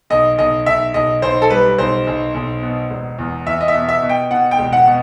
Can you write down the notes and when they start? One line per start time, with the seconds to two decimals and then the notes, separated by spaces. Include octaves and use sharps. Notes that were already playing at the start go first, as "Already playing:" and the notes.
0.10 B1 D#5
0.38 B1 D#5
0.66 B1 E5
0.94 B1 D#5
1.22 B1 C5
1.42 A4
1.50 G3 B4
1.78 B1 C5
2.07 B1
2.34 B1
2.62 B2
2.91 E1
3.19 E2
3.47 E2 E5
3.61 D#5
3.68 E5
3.74 B2
3.89 E5
4.02 B2
4.09 G5
4.31 B2 F#5
4.51 G5
4.59 E1
4.73 F#5
4.87 B2